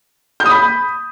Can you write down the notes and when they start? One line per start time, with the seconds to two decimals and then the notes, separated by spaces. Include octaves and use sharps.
0.40 G6
0.46 D#6
0.51 B5